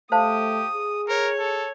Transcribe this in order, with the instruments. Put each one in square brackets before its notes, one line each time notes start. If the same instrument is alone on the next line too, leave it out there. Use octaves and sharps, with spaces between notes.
[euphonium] A3 [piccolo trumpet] G4 [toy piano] C5 F5 A5 [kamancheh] D#6
[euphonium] G#4
[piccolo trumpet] A#4 [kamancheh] C#5
[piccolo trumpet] A4